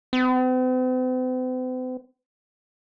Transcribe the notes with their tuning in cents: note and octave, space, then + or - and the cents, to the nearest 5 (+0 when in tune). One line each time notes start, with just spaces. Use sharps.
C4 -45